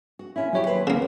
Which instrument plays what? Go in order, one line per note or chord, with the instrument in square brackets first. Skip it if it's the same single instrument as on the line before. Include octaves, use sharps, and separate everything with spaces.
[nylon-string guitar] F#4
A#2 C#4 E4
[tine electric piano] F#3 C#5 [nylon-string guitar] E4 F#4 G4
[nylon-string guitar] D#2 B4 C5
[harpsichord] C#3 A#3